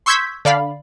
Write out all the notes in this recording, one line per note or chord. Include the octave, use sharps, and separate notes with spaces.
C6 C#6 E6 G6 G#6 B6
D3 D5 F5 B5